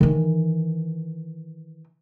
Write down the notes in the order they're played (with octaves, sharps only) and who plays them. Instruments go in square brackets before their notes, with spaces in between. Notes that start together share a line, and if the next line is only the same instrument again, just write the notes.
[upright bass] D#3 E3